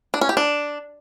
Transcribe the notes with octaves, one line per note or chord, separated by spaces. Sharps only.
D4
C#4
G4
D4